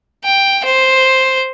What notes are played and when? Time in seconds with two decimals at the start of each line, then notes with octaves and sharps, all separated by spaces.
0.24 G5
0.65 C5